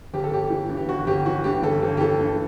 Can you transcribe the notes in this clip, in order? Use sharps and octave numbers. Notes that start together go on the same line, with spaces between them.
G1 G4
A4
G1 G4
E3
G2
G4
G1 F#4
G1 G4
E3 F#4
G2 G4
G1 A4
G1
G4
E3 A4
G2